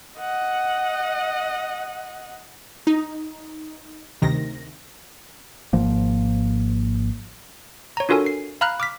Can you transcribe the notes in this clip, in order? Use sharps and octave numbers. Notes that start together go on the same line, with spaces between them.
D#5 F#5
D#4
D2 C3 D#3 A#6
G#1 G#2 F3 A#3
C#5 A#5
D4 F4 F#4 A4 A#4 G#5
C7
F5 A#5 B5 F6 F#6
D6 F6 B6